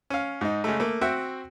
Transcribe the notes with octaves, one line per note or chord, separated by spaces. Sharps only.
C#4 F5
G#2 D#4
C#3 G#3 A3
A3 A#3
C4 F#4 E5 F#5 G5